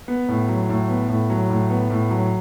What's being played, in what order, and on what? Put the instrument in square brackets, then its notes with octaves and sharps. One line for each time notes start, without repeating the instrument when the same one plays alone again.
[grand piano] B3
A2
F#3
A2
B3
A2
F#3
A2
B3
A2
F#3